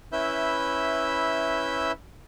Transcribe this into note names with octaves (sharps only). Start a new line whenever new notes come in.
C#4 E4 B4 E5 E6 G6